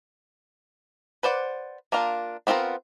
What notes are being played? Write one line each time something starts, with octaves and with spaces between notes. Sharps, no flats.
B4 C5 D5 F#5
A#3 D4 F4 A#4
B3 C4 F4 A4 A#4